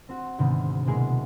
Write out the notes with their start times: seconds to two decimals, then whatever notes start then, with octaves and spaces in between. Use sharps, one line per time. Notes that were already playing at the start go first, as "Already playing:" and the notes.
0.09 C4 F#4
0.38 D2 G#2 C3 D#3 G#3 B3
0.87 B2 F#3 G#3 A#3 E4 G#4